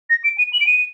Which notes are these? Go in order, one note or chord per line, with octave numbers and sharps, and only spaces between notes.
A#6
D7
D#7
F#7
D7
D#7